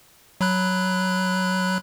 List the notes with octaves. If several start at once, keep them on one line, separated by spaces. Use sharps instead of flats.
F#3 B5 F#6